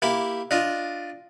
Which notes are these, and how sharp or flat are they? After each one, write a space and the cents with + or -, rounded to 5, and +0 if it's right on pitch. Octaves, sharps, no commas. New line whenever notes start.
A#3 +0 E4 +0 G4 +0
D4 +0 F4 +0 D#5 +0